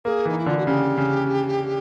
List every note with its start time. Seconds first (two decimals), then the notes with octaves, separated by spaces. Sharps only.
0.05 A#3 G#4
0.25 E3 D#4
0.39 E4
0.46 D3 F4
0.58 F#4
0.67 C#3 G4
0.97 C#3